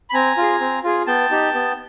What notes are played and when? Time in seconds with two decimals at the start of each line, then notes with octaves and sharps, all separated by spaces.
0.10 B5
0.14 C4 G#5 A#5
0.37 F4 G#4
0.61 C4
0.84 F4 G#4
1.07 B3 G5 A5
1.31 D#4 G4
1.54 B3